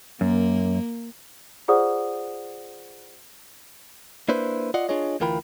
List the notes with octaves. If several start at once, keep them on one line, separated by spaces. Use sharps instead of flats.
F#2 A#3
F4 G#4 C5 D5 F#5 D#6
A#3 D4 E4 B4 C5
F4 D5 D#5 F#5
D4 F4 G#4 C#5 D#5
D2 E3 F4 A#4 G5 B5